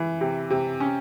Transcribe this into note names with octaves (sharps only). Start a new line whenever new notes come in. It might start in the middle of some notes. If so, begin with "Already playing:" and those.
Already playing: E3
C3
C3
C#4